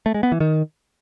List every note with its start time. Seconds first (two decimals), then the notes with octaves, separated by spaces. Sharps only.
0.06 A3
0.14 G#3
0.23 B3
0.32 E3
0.40 D#3